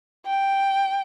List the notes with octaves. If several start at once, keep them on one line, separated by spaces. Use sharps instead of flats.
G5